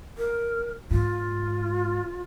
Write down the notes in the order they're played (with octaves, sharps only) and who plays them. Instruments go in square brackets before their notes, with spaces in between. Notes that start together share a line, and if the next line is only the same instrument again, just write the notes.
[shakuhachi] A#4
[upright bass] G#2 [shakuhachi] F4